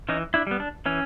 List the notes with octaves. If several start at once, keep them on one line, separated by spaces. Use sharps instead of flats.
E3 C#4 D#4
D4 E4
G3 B3
D4
E3 C#4